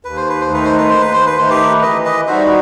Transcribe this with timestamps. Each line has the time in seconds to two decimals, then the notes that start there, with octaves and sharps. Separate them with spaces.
0.05 D#2 B4
0.17 C5
0.29 B4
0.41 C5
0.49 D#3 A3 D#4 B4
0.65 C5
0.78 B4
0.90 D#2 C5
1.01 B4
1.13 C5
1.26 B4
1.38 D#3 A3 D#4 C5
1.50 G4 B4
1.82 E3 B4 D#5
2.05 B4 D#5
2.27 G3 D#4 F#4 C5 E5